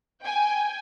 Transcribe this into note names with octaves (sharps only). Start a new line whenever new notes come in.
G5 G#5